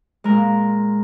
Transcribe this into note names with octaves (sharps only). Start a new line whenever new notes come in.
A#2 G#3 A#4